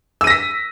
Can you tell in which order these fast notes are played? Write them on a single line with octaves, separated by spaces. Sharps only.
E6 D#7 A#6 B6